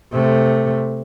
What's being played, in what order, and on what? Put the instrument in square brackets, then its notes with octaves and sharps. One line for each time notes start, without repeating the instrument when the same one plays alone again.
[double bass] C3 A3